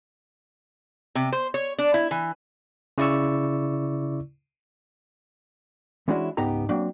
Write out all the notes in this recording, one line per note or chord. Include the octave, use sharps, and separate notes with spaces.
C3
C5
C#5
D4
E4
E3
C#3 E4 D5 C#6 E6
E3 G#3 C#4 D4 E4 F#4
C#2 G#2 B3 D#4 G4 A#5
F#3 A#3 C4 D4